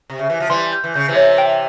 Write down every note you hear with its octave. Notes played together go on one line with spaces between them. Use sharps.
C3
C#3
E3
F3
E3 G3 C6
G6
E3
C#3 G6
C3 E3
C#5
G5